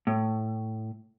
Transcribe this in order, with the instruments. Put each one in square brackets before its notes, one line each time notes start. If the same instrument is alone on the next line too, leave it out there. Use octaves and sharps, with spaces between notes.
[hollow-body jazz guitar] A2